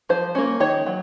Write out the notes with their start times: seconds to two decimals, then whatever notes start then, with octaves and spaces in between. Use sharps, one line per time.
0.09 F3 C5
0.35 A#3 C#4
0.60 D#3 C#5
0.87 F#3